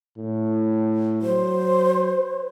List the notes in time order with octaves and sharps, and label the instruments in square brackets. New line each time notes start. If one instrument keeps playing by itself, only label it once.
[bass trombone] A2
[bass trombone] F#3 [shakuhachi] C5